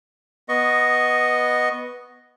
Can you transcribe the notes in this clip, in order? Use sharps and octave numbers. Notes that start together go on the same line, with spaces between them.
B3 D#5 C#6